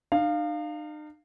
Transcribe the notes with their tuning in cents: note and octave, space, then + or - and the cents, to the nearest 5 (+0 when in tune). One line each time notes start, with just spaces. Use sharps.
D#4 -45 F5 +0